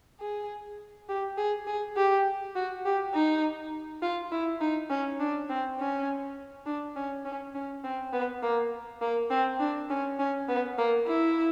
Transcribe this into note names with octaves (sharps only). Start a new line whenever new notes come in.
G#4
G4
G#4
G#4
G4
F#4
G4
D#4
F4
E4
D#4
C#4
D4
C4
C#4
D4
C#4
C#4
C#4
C4
B3
A#3
A#3
C4
D4
C#4
C#4
B3
A#3
E4